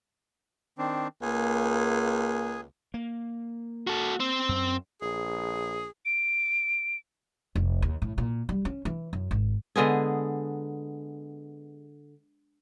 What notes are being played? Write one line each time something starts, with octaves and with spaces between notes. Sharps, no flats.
D#3 C4 D4
C#2 A#3 G#4
A#3
F#4 A4
C4
F#2
A#1 G#4
D7
F1
D#2
A2
A#2
G3
C#4
E3
F#2
G#1
D3 G#3 B3 G#4